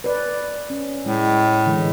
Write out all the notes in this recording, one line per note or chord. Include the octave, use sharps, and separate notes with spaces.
B4 D5
C#4
A2 G#3
D3 E3 G#3